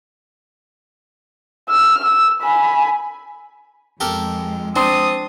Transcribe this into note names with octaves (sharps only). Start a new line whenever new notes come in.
E6 F6
E6
G#5 B5
F2 G#3 G4 A4 A#4
C4 D4 C6 D#6